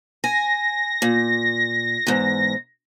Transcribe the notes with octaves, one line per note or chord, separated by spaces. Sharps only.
G#5 A#6
A#2
E2 G#2